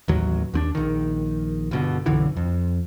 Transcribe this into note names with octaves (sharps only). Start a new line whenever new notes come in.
A1 D#2 F#3
D#2 C4 D4
A#1 D#3
G1 B2 D3
B1 F#2 D3 E3
F2